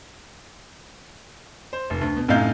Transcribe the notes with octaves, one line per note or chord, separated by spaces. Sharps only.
C5
F1
D2
B2
F#2 A2 C3 D#4 F5 G6